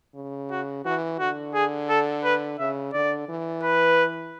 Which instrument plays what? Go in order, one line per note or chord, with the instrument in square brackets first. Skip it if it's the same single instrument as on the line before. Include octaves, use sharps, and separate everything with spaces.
[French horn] C#3
[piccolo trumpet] F#4
[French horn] E3 [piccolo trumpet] F#4
[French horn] D3 [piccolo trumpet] F#4
[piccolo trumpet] G#4
A4
B4
[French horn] C#3 [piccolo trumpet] E5
[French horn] D3 [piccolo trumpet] D5
[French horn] E3
[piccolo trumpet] B4